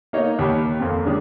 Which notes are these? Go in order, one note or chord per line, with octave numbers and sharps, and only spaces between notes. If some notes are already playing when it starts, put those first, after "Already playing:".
A#3 D#4 C#5 D#5
D#2 G4 C#5 B5
F2 A#3 C4
D3 D#3 G#3 C#4 D4